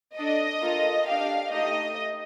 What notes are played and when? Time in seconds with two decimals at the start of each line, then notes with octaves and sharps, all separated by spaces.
0.16 D4 A4 D#5
0.61 A#3 F4 A4
1.07 D4 G4 F5
1.51 A3 D#4 G4 D#5